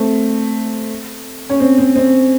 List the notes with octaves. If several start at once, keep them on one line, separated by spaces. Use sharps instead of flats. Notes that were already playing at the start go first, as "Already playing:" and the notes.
Already playing: A3 C4
C#4
C4
C4
C4